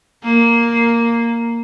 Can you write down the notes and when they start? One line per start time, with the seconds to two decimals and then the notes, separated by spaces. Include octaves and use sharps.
0.24 A#3